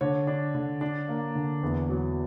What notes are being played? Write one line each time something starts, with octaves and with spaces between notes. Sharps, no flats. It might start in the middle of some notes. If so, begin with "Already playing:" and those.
D3 C#5
D4
D3
D4
A#3
D3
E2
F#3